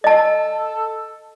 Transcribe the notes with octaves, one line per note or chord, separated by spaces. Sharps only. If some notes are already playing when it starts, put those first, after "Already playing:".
A4 D#5 A5